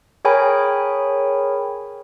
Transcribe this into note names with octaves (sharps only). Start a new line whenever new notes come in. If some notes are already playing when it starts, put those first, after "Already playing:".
G#4 A#4 C#5 G5 G#5 B5